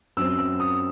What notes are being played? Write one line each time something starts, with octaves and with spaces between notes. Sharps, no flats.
F#2 F#3 C4 E6
E6
D#6